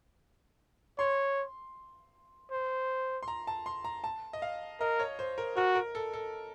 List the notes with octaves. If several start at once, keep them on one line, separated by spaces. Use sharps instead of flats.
C#5 C6
C5
C6
A#5
A5
C6
A#5
A5
D#5
F5
A#4 D#5
C#5
C5
A#4
F#4 A#4
A#4
A4
A4